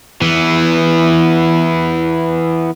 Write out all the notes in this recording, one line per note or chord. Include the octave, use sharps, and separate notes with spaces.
E3 B3